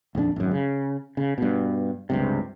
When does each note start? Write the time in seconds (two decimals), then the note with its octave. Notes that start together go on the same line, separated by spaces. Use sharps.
0.15 D#1 F2 F#3 D4
0.36 G#1 F#2
0.51 C#3
1.17 C#3
1.38 G2 B2
2.10 C#2 G2 C3